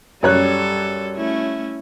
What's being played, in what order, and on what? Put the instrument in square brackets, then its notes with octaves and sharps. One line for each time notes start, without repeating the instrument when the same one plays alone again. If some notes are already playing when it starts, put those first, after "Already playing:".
[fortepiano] F#2 C#5 F#6 [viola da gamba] G3 A4
[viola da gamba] A3 C#4 E4